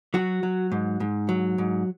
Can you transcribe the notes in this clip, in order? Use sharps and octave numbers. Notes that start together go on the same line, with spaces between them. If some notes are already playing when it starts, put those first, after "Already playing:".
F#3 F#4
F#3
G#2
G#2
F#3
G#2